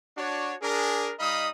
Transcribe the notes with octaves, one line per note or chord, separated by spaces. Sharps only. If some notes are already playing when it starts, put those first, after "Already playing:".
D4 F#4 C#5
D4 G#4 A#4
G3 D#4 D#5 F5 B5 D#6